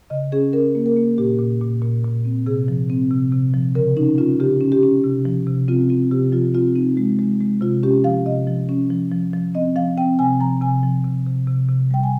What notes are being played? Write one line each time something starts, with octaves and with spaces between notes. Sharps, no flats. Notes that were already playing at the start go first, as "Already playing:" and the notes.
C#3 D#5
C#4 G#4
C#4 A#4
A#3
A#4
A#3
A#2 G4
A#2
A#2
A#2
A#2
C4
C3 G#4
F3
C4
C3
C3
F3
C#3 A#4
C#4 D#4
C#4 F4
C#3 G4
C#4
G4
C#4
C3
F3
C3
C4 F4
C4 F4
C3 G4
F3 F4
C4 F4
C4 D#4
G#3
G#3
G#3
C3 F4
C#4 G4
F3 F5
C3 D#5
F3
C#4
F3
F3
F3
C4 D#5
F3 F5
C4 G5
C3 G#5
F3 A#5
C3 G#5
F3
C3
C3
C3
C3
G3 G5
G#5